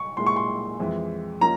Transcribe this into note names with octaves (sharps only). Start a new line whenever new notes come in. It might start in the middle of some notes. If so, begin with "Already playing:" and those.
Already playing: C#6
A#2 G#3 E4 C6
C#6
C6
F2 E3 G#3
F3 A#3 C#4 A#5